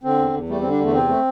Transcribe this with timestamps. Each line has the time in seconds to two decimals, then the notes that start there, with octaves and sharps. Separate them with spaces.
0.03 D3 C4
0.18 E2
0.33 E2
0.49 G3 A3
0.61 D3 C4
0.72 D4
0.79 E2 A3
0.94 C3 C4
1.09 A3